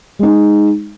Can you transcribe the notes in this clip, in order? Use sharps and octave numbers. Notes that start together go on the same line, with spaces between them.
G#3 D#4